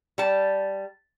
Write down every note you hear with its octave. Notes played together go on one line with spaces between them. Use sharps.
G3 A5